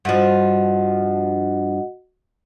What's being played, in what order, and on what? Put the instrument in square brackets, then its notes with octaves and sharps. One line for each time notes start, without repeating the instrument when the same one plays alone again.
[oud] G2 F3 [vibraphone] F#4 D#5 F#5